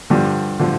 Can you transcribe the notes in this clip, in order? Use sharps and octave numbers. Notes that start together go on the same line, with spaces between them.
G2 D3 F3
D3 F3